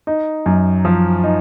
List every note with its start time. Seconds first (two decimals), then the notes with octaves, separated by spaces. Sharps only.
0.07 D#4
0.46 F#2
0.85 F3
1.24 D#4